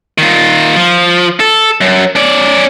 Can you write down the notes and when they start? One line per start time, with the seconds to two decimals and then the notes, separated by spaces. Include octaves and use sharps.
0.18 D#3 F4
0.76 F3
1.40 A4
1.81 F#2
2.15 C#4 D5